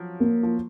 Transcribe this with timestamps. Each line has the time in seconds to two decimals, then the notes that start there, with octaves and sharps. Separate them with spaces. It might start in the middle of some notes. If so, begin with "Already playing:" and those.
Already playing: F3 F#3
0.20 A#3
0.43 F3